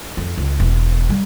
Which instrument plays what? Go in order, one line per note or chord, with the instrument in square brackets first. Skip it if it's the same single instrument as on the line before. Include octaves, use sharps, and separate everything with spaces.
[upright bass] F2
C#2
E1
G3